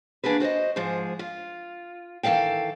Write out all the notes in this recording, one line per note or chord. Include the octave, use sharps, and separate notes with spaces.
E3 A#3 D4 F#4 G#4 B4
F#4 C5 C#5 D#5
G#2 F3 G#4
F4
D#3 E3 B3 A4 F5 G5